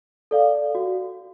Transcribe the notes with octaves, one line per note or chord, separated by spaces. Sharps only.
A4 D5 F5
F#4